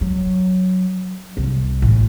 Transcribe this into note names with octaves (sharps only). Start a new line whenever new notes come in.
F#3
C2
A1